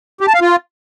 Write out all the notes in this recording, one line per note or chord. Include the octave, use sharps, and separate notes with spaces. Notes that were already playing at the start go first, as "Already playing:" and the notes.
G4
A5
F5
F4